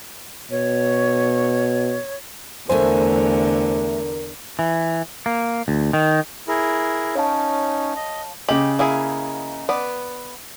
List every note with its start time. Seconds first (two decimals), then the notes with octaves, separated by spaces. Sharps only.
0.51 B2 C#5
2.69 E2 D3 A3 A#4 C5 E5 G#5
4.59 E3
5.26 A#3
5.68 D2
5.93 D#3
6.48 E4 G#4 A#4
7.15 C#4 D#4 C#5 F5 A5
7.96 D#5
8.49 C#3 G4 D#5 F#7
8.79 A#3 E4 G#4
9.69 B3 D5